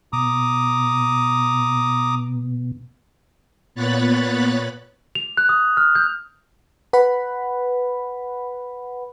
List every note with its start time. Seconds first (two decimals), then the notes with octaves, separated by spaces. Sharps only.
0.13 B2 A#5 D6 D#6
3.75 A#2 B3 C#5 B5 F#6 A6
5.15 F7
5.37 F#6
5.49 D#6
5.77 F6
5.95 G6
6.93 B4 F#5 B5